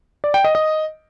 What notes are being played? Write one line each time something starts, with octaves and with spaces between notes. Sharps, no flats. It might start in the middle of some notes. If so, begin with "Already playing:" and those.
D5
G5
D#5
D#5